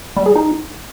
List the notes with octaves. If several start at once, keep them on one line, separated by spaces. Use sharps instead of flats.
G3
G#4
D#4